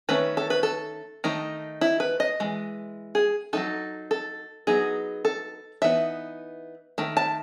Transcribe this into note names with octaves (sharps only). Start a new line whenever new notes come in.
D#3 A3 C#4 B4
A4
B4
A4
D#3 A3 D#4
E4
B4
D#5
E3 G#3
G#4
F#3 A3 D#4 A4
A4
F#3 B3 D#4 G#4
A4
E3 B3 D#4 E5
D#3 A3
A5